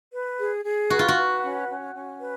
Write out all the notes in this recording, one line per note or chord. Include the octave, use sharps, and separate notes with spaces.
B4
G#4
G#4
F#4 B4
F4
F#4
B4
C#4
C#4
C#4
B4